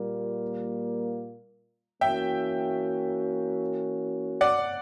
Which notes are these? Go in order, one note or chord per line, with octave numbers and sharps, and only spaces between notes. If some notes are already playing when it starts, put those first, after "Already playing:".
Already playing: A#2 G3 A#3
E3 A#3 C#4 F#4 E5 G5
D5 F#5